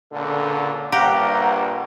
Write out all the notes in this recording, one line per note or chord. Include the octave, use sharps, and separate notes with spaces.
C#2 A#2 D3
A#1 G2 G4 F5 F#5 A#5